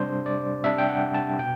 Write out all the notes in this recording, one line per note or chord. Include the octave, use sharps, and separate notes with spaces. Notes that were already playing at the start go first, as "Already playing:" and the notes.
Already playing: C3 G3 D4 C5
D5
C3 G3 D4 E5
G5
F#5
A5
B2 G5